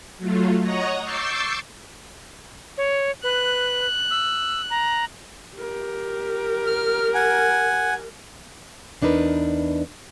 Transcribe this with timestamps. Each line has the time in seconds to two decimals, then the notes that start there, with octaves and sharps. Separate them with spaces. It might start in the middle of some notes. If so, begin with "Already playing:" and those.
0.18 F#3 A3 F4
0.61 C#5 D#5 F#5 A#5 C#6 D#6
1.03 C#6 D6 E6 G6 A6 C7
2.77 C#5
3.23 B4 F#6
4.11 E6
4.70 A#5
5.57 G4 A#4
6.67 F6
7.15 F#5 G#5
9.02 E2 D4 D#4 A#4 B4